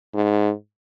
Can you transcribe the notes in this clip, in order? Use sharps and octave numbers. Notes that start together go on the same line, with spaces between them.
G#2